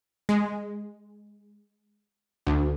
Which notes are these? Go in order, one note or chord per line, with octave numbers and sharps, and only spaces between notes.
G#3
D2